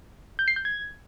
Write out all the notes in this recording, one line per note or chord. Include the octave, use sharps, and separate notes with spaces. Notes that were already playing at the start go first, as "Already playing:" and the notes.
G6
C7
G6
G#6